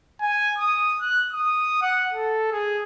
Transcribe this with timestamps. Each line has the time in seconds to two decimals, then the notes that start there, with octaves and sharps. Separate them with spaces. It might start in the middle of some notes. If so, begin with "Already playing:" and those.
0.21 G#5
0.58 D#6
1.01 F#6
1.32 D#6
1.82 F#5
2.12 A4
2.52 G#4